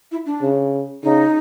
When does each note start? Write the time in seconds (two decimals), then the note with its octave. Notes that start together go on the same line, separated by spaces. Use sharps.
0.12 E4
0.26 D4
0.42 C#3
1.03 C#3 D#4